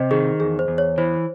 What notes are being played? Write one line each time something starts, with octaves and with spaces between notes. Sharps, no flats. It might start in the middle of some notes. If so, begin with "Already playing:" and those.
Already playing: C3 C5 D#5
D#3 G#4
E2 G#4
C5
E2
C#5
E3 C5